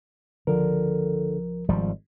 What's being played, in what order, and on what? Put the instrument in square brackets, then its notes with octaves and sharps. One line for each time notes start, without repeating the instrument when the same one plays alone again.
[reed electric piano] C#2 F3 A#4 [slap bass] D3
[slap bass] G#1 F3 G3